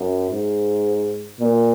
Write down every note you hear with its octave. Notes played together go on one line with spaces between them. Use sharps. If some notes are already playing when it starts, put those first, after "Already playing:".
Already playing: F#2
G#2
A#2